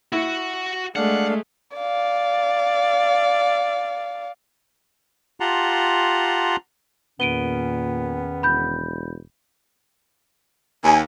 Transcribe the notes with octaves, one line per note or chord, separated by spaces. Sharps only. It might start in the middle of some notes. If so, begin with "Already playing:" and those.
E4 F#4 F#5
G#3 A3 D4 F5 F#5
D5 F5
F4 G4 F#5 A5 A#5 C6
E2 A#2 D#3 B3 C#4 D7 D#7 G7
E1 B5 G6
D#2 G#5